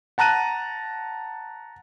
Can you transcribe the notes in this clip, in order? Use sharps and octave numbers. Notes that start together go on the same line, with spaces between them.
F#5 A5 A#5 F#6 D#7